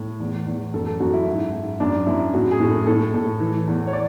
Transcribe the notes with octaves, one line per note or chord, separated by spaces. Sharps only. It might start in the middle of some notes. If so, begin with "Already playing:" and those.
Already playing: A2
E2
E2
F#2 A4
A4
F#2 F#4
E4
G#2 E4
G#2
F#2 D4
F#2 E4
A2 F#4
G#4
A2
A4
A2 A4
A2
E3
E2
C#5
D5